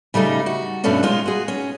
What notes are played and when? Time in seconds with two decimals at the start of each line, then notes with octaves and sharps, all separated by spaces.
0.14 C#3 G3 A3 D#4
0.46 F#4
0.84 G2 B2 A3 C#4 D4
1.03 G#3 D#4 F4
1.26 F#4 G#4
1.48 C#4